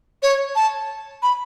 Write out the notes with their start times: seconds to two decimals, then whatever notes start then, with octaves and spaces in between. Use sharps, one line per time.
0.23 C#5
0.56 A5
1.23 B5